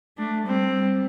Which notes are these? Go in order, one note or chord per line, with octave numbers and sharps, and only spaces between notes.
A3 D4
G3 C4
G3